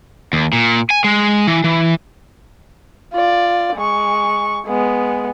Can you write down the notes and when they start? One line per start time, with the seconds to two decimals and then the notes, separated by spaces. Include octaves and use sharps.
0.33 D#2
0.53 A#2
0.90 G#5
1.04 G#3
1.47 E3
1.64 E3
3.14 F4 D5
3.76 G#3 C#6
4.67 G#3 B3